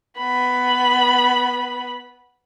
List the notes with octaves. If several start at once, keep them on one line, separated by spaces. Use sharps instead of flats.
B3 B5